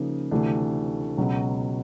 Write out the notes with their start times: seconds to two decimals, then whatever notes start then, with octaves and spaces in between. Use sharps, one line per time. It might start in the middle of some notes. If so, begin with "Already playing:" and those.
Already playing: C#3 F3 A#3 D#4
0.31 D2 C3 E3 A3 D4
1.17 C#2 B2 F#3